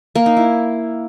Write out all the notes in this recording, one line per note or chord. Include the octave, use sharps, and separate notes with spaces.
A#3
D#4
E4